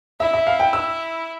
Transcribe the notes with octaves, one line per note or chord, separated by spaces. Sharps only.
E4 E5
E5
F5
G5
E6